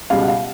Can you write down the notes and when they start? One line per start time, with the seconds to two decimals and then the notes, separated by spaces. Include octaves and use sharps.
0.10 C#2 B2 G3 F5
0.21 F#5
0.28 F5